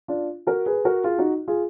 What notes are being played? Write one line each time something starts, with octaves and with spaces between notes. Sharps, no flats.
D4 F4
F#4 A#4
G#4 B4
F#4 A#4
F4 G#4
D#4 F#4
F4 G#4